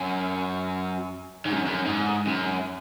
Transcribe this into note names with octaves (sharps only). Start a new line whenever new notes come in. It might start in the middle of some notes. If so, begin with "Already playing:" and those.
Already playing: F#2
G#2
F#2
F#2
G#2
F#2